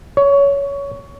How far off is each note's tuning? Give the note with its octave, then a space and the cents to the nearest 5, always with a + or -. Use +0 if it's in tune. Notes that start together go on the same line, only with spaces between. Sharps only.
C#5 +20